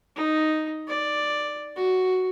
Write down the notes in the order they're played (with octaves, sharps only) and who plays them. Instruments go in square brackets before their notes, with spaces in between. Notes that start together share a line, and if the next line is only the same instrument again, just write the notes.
[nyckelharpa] D#4
D5
F#4